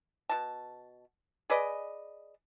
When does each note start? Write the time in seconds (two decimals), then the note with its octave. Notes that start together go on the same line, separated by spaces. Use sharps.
0.29 B2 A5
1.50 G#4 B4 D5 D#5